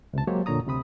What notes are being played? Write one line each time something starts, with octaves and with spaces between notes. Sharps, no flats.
C#2 C3 A5
F#3 G#3 A#3 G4 C5 C#5
F2 A#2 D3 C#5 A#5 D#6
D2 C3 C4 B5 D#6